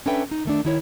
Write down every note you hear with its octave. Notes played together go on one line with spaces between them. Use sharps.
C#4 D4 A4 B4 E5 G5
D#4
D#3 A3 D4
D#3 E4 C#5